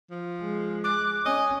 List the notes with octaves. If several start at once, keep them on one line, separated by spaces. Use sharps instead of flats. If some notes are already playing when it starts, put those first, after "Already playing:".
F3
G#3
D6 F#6
C#4 D#5 G#5